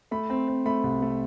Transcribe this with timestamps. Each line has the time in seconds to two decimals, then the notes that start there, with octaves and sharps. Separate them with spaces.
0.11 A3 B5
0.30 C4
0.48 C4
0.66 A3 B5
0.84 C2
1.02 A3